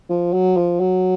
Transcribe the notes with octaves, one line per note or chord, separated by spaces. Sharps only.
F3
F#3
F3
F#3